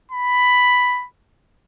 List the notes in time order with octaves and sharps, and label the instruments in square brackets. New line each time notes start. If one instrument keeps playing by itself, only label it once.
[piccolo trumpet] B5